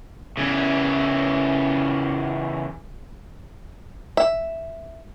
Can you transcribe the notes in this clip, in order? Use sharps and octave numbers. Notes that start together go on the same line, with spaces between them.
C#3 E3
E5